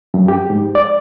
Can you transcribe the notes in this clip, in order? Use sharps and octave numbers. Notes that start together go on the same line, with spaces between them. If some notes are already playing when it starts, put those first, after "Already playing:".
F#2
G4
G#2
D5